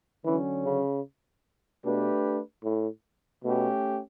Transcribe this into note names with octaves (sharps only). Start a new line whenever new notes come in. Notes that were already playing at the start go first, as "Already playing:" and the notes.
D3 E3 F#3 C#4
C#3
B2 A3 D4 G4 B4
A2
B2 A3 C#4 G4